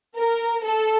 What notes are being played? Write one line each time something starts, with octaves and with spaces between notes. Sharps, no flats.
A#4
A4